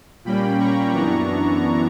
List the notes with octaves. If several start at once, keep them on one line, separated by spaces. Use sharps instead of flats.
A#2 G3 A#3 C#4 G5 B5
A#5 C#6
F#2 E3 B3 D4 A#5 C#6